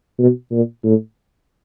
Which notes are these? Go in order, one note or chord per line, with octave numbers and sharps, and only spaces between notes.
B2
A#2
A2